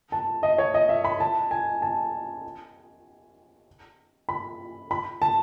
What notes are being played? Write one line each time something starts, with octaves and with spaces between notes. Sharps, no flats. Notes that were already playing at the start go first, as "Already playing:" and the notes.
A5
D#5
C#5
D#5
E5
B5
A5
G#5
A5
B5
B5
A5